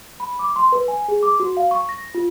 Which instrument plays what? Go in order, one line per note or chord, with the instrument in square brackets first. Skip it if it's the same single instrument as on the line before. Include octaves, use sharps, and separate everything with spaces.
[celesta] B5
D6
C6
B4
G#5
G#4
D6
F#4
F5
C#6
A#6
F4